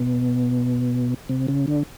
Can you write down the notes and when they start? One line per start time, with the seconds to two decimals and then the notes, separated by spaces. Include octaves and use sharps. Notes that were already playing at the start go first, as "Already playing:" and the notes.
Already playing: B2
1.29 C3
1.48 C#3
1.67 D3